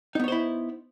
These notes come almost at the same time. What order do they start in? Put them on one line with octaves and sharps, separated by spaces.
D#4 B3 C#5 C5 E4